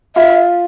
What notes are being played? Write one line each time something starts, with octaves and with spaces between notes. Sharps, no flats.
F4 E5